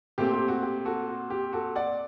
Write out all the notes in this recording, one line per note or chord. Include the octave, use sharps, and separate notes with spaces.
A#2 A3 C4 G4
G4
F#4
G4
F#4 A4
F#4
G4
F#4 A4
D5 F#5